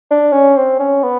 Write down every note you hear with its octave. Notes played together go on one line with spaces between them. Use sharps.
D4
C#4
C4
C#4
B3